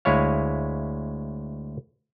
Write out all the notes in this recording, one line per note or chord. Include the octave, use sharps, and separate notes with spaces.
D2 G#3 E4 C#5 F5